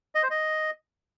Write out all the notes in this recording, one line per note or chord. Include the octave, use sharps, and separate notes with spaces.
D#5
C5
D#5